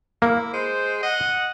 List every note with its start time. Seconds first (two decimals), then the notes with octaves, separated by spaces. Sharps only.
0.22 A#3 E4
0.53 G#3 C5
1.02 D#5 F#5